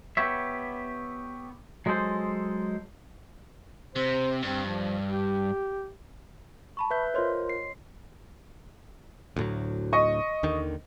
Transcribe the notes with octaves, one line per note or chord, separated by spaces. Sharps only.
B3 G4 C#5 E5
F#3 G#3 G#4 A4 C5
C3 C5
G2 C4
F3
G4
A5 B5 C#6
B4 E5 G6
F4 A#4 C5 C#5 D#5 C6
C7
D2 A2 F#3
D#5 C#6
D#2 D3 D#3